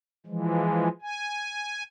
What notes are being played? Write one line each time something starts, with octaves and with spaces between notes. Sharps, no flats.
E3 F3 G#3
G#5